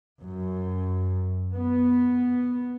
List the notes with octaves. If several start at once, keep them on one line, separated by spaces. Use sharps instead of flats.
F#2
B3